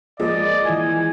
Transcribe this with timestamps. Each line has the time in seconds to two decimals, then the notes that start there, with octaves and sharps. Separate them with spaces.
0.20 F3 G#3 A#3 D5 D#5
0.65 E3 E4 G#5